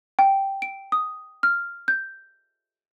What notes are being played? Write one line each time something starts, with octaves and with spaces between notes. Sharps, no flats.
G5
D7
D#6
F6
G6